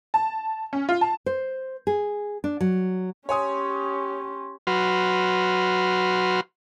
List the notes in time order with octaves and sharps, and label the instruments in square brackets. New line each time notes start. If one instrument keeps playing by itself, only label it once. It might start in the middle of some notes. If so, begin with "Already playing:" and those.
[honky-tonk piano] A5
C#4
F4
A5
[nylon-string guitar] C5
G#4
D4
F#3
[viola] C#4 G4 [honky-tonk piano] C#5 G#5 D#6 [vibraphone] C6
[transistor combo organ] F#3 F#4 B4 C6 F6